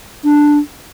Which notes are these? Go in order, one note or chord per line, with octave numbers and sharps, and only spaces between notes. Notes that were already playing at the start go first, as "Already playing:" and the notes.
D4